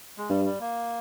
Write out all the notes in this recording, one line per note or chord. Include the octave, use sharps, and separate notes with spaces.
G#3
G2 G3
G3
A#3